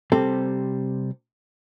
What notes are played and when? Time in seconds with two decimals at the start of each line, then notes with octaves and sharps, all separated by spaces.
0.12 C3 G3 C4 A4